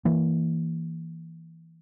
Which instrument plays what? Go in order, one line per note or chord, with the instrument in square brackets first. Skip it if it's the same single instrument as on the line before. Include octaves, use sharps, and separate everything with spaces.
[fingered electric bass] E3 A#3